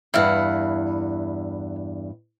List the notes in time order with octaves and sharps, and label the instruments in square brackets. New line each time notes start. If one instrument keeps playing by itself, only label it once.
[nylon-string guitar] E2 G2 [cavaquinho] E4 F5 F#5